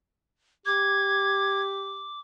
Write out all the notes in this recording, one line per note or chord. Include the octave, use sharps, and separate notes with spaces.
G4 D6 G#6